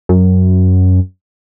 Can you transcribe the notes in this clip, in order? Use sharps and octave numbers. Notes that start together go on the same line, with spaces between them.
F#2